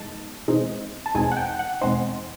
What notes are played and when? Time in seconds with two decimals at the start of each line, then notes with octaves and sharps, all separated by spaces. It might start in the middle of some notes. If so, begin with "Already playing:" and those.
Already playing: E2 B2 G#3 D#4 A5
0.48 E2 B2 G#3 C4 D#4
1.06 A5
1.15 E2 B2 G#3 C4 D#4 G#5
1.32 F#5
1.37 G5
1.59 F#5
1.81 E2 B2 G#3 C4 D#4 C5